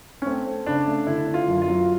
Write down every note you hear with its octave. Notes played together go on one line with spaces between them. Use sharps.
C#4
A3 C4
A3
C#3 D4
A3
D3 E4
D3
F4
F#2
F4
F#3